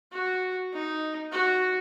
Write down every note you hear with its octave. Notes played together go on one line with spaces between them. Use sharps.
F#4
D#4
F#4